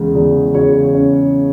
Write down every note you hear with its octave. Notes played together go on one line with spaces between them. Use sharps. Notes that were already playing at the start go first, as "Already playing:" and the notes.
Already playing: E2 C#3 G#3
E2
C#3 C#5
C#4